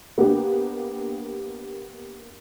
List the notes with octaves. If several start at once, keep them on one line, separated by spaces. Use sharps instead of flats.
A#3 B3 D4 G4